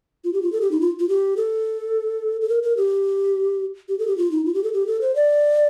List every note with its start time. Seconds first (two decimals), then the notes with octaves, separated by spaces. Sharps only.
0.24 F4
0.33 G4
0.43 F4
0.52 A4
0.61 G4
0.71 D#4
0.81 F4
1.00 F4
1.09 G4
1.37 A4
2.41 A4
2.49 A#4
2.63 A#4
2.77 G4
3.89 G4
3.99 A4
4.07 G4
4.18 F4
4.32 D#4
4.45 F4
4.54 G4
4.64 A4
4.73 G4
4.87 A4
5.01 C5
5.16 D5